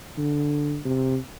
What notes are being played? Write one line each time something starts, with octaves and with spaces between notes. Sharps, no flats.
D3
C3